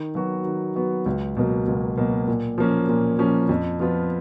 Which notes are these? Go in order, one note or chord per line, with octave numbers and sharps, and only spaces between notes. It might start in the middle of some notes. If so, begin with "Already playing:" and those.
Already playing: D#3
F#3 B3 F#4
D#3
F#3 B3 F#4
C#2
B2 F#3 A#3
C#2
B2 F#3 A#3
A#2
F3 A#3 C#4
A#2
F3 A#3 C#4
F2
F3 B3 F4